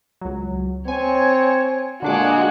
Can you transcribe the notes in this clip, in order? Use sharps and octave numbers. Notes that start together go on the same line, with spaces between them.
C#2 F#3
C4 C#5 G#5
A#2 D3 G#3 D4 F#4 D6